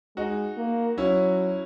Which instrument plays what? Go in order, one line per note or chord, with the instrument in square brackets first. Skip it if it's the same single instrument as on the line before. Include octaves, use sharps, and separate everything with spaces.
[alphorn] G#3 [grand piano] D#4 F#4
[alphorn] A#3
[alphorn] F#3 [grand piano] C#4 E4